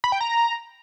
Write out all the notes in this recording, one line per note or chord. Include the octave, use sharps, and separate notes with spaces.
B5
G5
A#5